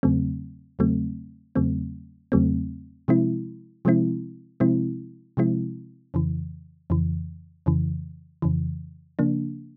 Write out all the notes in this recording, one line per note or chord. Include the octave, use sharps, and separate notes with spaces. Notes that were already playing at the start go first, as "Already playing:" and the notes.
E2 C#3 F#3 A3 C4
E2 C#3 F#3 A3 C4
E2 C#3 F#3 A3 C4
E2 C#3 F#3 A3 C4
C3 F3 G#3 C4 E4
C3 F3 G#3 C4 E4
C3 F3 G#3 C4 E4
C3 F3 G#3 C4 E4
F2 C#3 E3
F2 C#3 E3
F2 C#3 E3
F2 C#3 E3
C#3 F3 A#3 D4